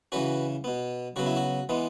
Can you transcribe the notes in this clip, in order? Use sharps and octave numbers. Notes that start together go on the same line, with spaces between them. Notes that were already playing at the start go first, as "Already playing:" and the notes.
C#3 E3 C#4 F#4 B4
B2 B3
C#3 F#3 B3 F#4
E4
F#4
E3 G#3 B3